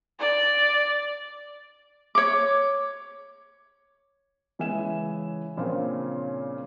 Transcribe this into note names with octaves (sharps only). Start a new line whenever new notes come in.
D5
C#5 D6
C#3 E3 G#3 E5 G#5 E7
A#2 C#3 F3 C4 D4 F4